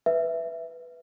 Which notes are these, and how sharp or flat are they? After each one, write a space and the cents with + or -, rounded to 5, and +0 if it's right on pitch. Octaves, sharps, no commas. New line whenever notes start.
B4 +0 E5 +0